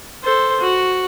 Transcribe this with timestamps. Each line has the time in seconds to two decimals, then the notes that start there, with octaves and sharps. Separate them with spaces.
0.23 A4 C5
0.60 F#4